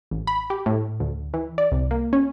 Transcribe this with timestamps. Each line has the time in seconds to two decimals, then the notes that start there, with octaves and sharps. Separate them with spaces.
0.11 A1
0.27 B5
0.50 G4
0.66 A2
1.00 D2
1.34 E3
1.58 D5
1.72 C2
1.91 A#3
2.13 C#4